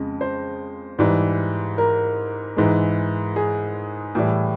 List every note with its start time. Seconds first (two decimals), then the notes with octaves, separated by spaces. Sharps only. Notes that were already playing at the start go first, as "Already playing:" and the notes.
Already playing: F2 C#3 G#3
0.21 C5
0.99 G#2 E3 G3
1.78 A#4
2.57 G#2 E3 G#3
3.36 G#4
4.15 A2 E3 G3